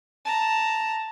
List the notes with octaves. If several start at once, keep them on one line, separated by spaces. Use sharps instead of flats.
A5 A#5